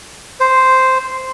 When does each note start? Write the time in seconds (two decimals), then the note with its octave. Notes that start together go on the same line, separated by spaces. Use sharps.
0.40 C5